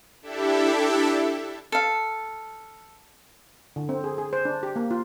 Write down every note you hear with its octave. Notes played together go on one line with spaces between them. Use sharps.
D4 E4 G4 A4 E5
A4 F5
D3
C4
G#4
G#4
C5
D4
G4
A#3
F4